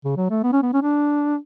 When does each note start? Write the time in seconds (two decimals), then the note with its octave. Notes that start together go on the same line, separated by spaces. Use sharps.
0.05 C#3
0.17 F#3
0.30 A3
0.43 B3
0.53 C#4
0.62 B3
0.73 C#4
0.82 D4